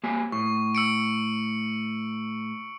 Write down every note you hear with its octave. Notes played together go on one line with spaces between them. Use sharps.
A#3 G4 G#5
A2 C#6
E6 C#7 D7